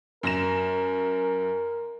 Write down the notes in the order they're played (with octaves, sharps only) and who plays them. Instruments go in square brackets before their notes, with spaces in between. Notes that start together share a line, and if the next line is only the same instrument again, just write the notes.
[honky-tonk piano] F#2 A#6 E7 [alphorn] A#4